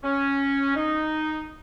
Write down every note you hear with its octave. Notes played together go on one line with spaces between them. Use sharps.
C#4
D#4